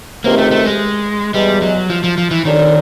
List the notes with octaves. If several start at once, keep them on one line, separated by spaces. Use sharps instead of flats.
C#2 C3 D#3 A#3
A3
A3
G#3
E2 B2 G3 G#3
F#3
F3
F3
F3
E3
C2 A#2 D#3 F#3 A3 D4